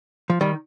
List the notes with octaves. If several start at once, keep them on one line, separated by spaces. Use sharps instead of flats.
F3
D#3 G3